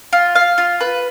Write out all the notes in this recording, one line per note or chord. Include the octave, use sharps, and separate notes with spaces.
F4
F5
F4
B4